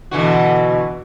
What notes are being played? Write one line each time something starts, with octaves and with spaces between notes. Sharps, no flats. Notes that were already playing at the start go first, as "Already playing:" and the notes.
B2 D3 E3 F#4